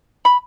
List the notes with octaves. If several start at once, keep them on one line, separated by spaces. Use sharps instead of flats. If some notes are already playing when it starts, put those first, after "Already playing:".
B5